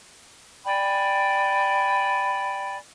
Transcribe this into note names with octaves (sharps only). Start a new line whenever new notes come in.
D5 G5 G#5 B5